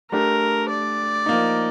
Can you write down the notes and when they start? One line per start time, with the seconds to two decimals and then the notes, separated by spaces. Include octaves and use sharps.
0.12 A3 D4 G4 A#4
0.69 D5
1.26 F3 A#3 D#4